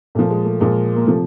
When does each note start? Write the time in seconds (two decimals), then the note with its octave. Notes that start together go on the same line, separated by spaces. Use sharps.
0.15 A#2 F3 A3
0.30 G#3
0.45 A3
0.60 A#2 F3 G#3
0.96 A#3
1.05 C3 F3 A3